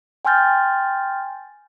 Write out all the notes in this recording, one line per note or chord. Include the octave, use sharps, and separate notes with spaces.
G5 G#5 C6 F6 G6 A6